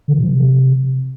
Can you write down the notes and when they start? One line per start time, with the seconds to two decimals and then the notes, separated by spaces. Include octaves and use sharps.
0.08 D3
0.13 E3
0.18 B2
0.24 F3
0.29 C3